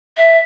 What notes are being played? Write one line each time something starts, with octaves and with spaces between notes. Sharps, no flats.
E5